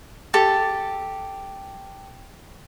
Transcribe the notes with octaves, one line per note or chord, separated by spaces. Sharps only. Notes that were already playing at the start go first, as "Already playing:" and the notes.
G4 A4